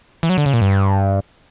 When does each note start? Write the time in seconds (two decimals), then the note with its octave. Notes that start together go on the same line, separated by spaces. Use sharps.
0.23 E3
0.30 F#3
0.38 D3
0.46 C#3
0.53 A#2
0.61 G2